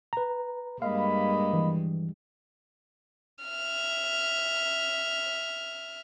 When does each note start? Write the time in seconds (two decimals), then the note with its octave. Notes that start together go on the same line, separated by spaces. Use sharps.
0.13 B4 A#5
0.82 G2 G#3 A#3 D#5 F5 B5
1.53 E3
3.44 E5 F6